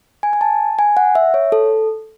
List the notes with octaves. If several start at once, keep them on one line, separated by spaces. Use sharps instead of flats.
G#5
G#5
A5
G#5
F#5
E5
C#5
A4